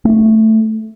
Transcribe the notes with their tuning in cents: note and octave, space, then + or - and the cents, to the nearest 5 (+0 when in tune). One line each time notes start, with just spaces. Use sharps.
A3 +5